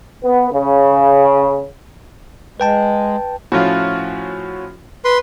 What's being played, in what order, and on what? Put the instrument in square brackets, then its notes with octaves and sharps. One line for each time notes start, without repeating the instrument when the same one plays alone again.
[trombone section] B3
C#3
[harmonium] G#3 [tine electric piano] B4 G5 A5
[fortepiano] A2 F3 F4 [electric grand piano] C#4 F#4
[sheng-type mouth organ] B4 C6